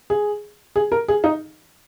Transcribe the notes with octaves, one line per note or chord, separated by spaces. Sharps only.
G#4
G#4
A#4
G#4
D#4